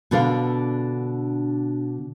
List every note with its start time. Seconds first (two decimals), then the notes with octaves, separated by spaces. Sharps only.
0.11 B2 D3 D4 A4 B4 F5